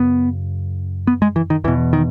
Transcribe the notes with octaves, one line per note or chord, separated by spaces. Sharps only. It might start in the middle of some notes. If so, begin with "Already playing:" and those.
Already playing: F#2 C#3 B3
B3
G#3
E3
D#3
E2 B2 E3
D#3